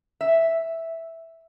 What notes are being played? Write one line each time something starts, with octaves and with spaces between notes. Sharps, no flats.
E5